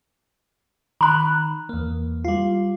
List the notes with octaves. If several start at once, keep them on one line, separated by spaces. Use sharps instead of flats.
D#3 A#5 B5 F#6
E2 A#3
G3 F4